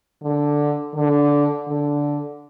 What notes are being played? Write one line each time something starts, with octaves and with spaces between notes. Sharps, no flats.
D3
D3
D3